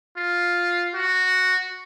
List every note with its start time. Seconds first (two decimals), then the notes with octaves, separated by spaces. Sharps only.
0.17 F4
0.95 F#4